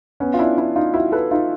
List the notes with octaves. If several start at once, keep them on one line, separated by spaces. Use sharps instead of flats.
B3 C#4
F4
D4 E4
D4 E4
D#4 F4
E4 F#4
A4 B4
D#4 F4